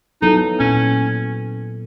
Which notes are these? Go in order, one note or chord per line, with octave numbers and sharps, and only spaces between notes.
F#3 B3 D#4 E4 A4
A#2 C#4